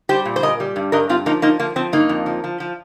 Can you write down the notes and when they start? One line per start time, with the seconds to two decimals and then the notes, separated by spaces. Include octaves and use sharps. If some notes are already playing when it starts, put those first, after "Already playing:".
0.09 G3 G4 C5
0.25 A#2
0.36 C5
0.43 A#2 A#4 D#5
0.60 G3
0.76 G2
0.92 G2 A#4 D#5
1.09 G2 C4 F4
1.26 F3 A#3 D#4
1.42 F3 A#3 D#4
1.60 F3 A#3
1.76 F3 C4
1.92 G2 A#3 D#4
2.09 F2
2.26 F3
2.44 F3
2.60 F3